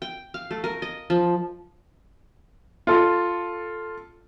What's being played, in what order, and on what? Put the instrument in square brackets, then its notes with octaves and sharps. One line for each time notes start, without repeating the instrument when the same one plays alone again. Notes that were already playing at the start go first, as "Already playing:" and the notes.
[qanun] G5
F5
A3
A#4
D#5
F3
[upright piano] F4 A4